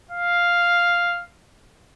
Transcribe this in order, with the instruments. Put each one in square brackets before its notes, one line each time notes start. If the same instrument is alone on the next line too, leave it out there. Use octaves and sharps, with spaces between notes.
[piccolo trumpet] F5